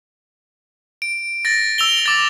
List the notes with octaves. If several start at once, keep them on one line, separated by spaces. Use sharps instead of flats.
D7
A6 A#6
E6 F7 G7
D6 A6